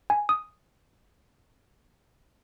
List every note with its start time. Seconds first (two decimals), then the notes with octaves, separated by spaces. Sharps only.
0.10 G#5
0.29 D#6